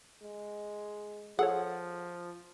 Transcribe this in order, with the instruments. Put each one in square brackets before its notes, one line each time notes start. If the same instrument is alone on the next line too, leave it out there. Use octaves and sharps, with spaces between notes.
[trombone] G#3
[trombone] F3 [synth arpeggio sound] G#4 A4 C#5 [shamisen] F#5